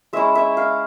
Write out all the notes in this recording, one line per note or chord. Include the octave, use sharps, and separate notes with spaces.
G#3 C#4 E4 E5
E5
F5